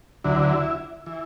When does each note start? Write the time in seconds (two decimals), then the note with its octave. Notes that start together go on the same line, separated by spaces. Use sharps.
0.24 D2 D3 F#3 E4
1.06 E3